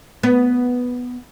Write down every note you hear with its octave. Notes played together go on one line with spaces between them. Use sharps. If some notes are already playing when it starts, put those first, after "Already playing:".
B3